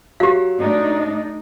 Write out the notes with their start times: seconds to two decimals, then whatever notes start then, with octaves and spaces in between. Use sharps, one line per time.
0.20 F#3 G4 F5
0.59 A3 D4 D#4